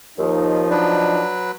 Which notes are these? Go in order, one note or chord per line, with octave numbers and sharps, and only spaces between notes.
D#2 F3 D#4
F#3 D4 B4